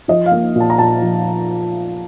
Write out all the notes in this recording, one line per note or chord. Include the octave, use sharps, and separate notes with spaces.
F3 D#5
F5
A#3
A#2 A5
A#5
A#2 A5
F3